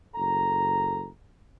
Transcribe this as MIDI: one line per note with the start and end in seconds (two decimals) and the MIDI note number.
0.15 1.07 30
0.15 1.07 69
0.15 1.07 82